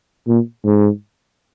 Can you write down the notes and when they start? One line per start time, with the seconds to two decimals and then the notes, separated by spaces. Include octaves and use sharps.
0.27 A#2
0.65 G#2